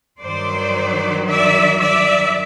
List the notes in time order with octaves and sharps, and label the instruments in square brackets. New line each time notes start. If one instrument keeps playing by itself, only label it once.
[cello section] G2 D#3 F#3 C5 D5
D5 E5
D5 E5